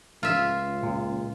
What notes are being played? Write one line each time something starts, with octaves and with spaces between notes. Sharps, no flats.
C#2 F4 E5
A#2